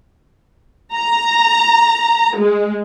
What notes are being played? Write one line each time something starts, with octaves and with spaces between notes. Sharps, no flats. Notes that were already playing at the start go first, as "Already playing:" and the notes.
A#5
G#3